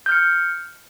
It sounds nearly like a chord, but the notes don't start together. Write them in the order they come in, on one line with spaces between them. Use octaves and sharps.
G6 F6 C#7